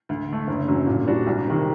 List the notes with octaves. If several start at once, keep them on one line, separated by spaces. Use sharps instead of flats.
D2
D3 A3
F#1
F#2 D3 F#3
A#2
G3 D4 F#4
C2
C3 D#3